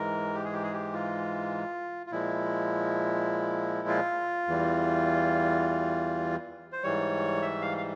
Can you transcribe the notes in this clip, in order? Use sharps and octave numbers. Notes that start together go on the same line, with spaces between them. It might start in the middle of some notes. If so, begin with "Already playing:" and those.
Already playing: G#2 E3 G#3 A#4
G4
G#4
G4
G#4
G4
F4
F4
A#2 F3 G#3 E4
F4
E2 E3 G3
C5
G#2 E3 G3 C#5
E5
F5
F5